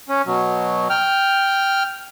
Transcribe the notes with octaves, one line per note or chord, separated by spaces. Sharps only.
C#4
B2 F#3
G5 F6